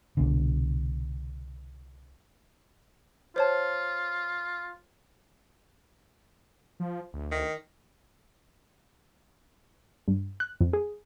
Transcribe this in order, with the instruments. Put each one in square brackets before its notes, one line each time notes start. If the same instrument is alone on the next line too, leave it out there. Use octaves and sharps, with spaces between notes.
[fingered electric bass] C2 B2 D3
[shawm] F4 [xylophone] C5 C#5 A5
[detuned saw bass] F3
D2
[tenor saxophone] D#3
[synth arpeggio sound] G2
F#6
F2
G#4